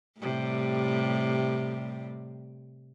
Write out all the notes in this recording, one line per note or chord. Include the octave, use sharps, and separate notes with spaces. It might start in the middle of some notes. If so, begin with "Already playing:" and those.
A2 C3 G3